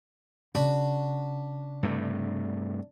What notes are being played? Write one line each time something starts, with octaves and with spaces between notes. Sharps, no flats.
C#3 D4 F#4 B5
G2 C3 A3